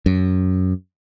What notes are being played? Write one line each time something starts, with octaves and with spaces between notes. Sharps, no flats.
F#2